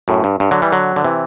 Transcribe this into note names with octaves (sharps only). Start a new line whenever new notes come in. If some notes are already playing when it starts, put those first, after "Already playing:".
F#2 A2
G2
G2
D3 F#3
E3 G3
D3 F#3
D3
C3 E3